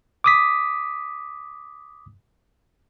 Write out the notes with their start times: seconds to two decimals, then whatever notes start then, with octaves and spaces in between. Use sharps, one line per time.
0.24 D6 D#6 B6